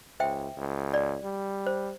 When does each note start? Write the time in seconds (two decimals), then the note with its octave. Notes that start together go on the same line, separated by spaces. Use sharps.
0.20 C#2 C5 E5 G5
0.58 C#2
0.94 D5
1.24 G3
1.67 C5